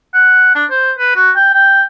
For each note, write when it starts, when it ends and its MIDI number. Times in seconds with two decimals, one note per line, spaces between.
0.14 0.52 78
0.55 0.65 62
0.71 0.92 72
0.99 1.11 71
1.16 1.31 66
1.36 1.50 79
1.54 1.83 79